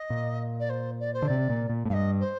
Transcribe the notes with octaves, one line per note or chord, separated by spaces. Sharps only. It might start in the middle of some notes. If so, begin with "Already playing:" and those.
Already playing: D#5
A#2
D5
C5
D5
C5
D3
C3 D5
A#2
A#2
A2
G2 D#5 F5
C5